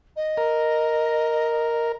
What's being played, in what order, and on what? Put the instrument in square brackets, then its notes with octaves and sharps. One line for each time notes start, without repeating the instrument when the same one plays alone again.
[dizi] D#5
[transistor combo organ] A#4